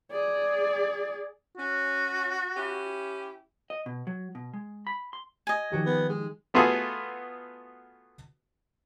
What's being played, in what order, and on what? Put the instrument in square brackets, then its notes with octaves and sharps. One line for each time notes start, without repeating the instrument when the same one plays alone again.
[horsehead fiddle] G#4 D5
[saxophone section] C#4 [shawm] F#4
[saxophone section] C#4 E4 G4
[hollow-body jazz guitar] D#5
B2
F#3
B2
G#3
B5
C6
[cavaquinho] D#5 G#5
[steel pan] D#3 F3 G4 [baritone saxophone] F#3
[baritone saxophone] B3
G#3
[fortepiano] A3 B3 F4 F#4 G#4 A4